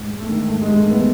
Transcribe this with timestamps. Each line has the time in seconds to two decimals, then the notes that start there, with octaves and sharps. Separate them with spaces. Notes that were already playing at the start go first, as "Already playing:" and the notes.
Already playing: G#2
0.10 G#2
0.20 A3
0.29 D#3
0.48 G#2 A3
0.62 G#3
0.67 G#2
0.77 A3
0.86 D#3 B3